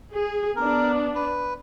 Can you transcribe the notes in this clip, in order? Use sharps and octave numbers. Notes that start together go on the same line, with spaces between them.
G#4
B3 D4 A#4
B4